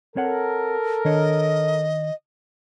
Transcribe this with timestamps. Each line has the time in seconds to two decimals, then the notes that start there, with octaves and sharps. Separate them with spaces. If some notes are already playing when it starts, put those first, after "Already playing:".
0.16 C4 A4 A#4 C#5 F#5
1.05 D#3 D4 C#5 D#5